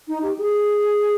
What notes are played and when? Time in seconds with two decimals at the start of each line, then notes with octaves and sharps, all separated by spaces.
0.08 D#4
0.23 G4
0.38 G#4